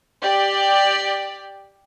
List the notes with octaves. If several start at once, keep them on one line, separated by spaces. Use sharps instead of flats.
G4 D5